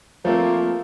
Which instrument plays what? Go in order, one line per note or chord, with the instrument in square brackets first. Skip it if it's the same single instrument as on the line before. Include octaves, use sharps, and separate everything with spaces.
[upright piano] F3 A3 C4 [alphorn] A#3